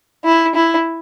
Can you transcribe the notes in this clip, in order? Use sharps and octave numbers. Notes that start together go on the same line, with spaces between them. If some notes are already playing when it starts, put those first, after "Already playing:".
E4
E4